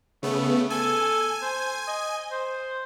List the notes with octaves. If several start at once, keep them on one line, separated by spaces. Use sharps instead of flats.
C#3 A3 B3
A4 G#5
C5
D#5
C5